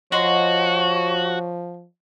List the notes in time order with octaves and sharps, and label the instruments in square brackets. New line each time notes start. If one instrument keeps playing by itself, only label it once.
[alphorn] F3 [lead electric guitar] F#4 [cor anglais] C#5 [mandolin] D#5 F#5 C6